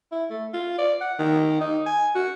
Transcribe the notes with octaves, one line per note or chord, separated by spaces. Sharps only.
E4
A3
F4
D5
F#5
D#3
D#4
G#5
F#4